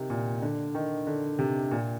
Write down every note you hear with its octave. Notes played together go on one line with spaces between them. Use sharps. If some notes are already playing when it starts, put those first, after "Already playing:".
Already playing: C3 D#3
A#2
D3
D#3
D3
C3
A#2